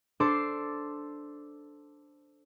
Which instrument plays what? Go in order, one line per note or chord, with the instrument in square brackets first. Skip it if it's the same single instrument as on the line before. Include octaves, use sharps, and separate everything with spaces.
[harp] D4 A4 C5 C6 D6